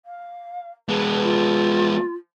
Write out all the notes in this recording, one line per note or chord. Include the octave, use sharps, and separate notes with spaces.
F5
G#3 B3 B4
F4